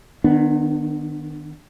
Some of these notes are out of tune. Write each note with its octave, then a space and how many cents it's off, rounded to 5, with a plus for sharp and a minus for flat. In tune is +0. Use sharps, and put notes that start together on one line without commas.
D#3 -30 B3 +0 D4 +15